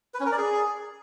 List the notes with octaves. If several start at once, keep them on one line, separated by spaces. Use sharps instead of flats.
B4
C#4
A#4
D5
G#4